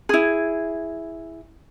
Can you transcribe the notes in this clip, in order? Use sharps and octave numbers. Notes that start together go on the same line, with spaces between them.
E4 G#4